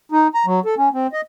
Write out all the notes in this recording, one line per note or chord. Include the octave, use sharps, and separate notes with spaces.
D#4
A#5
F#3
A4
C#4
C4
D#5